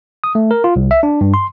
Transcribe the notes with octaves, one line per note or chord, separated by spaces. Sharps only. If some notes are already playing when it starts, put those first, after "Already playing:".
D#6
A3
A#4
F4
C2
E5
D4
G2
C6